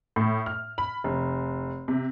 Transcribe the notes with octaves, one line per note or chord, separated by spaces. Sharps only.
A2
F6
B5
F1
C3